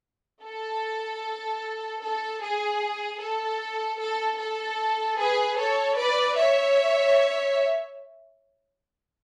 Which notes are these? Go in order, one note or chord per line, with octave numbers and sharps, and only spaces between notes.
A4
A4
G#4
A4
A4
A4
G#4 B4
A4 C#5
B4 D5
C#5 E5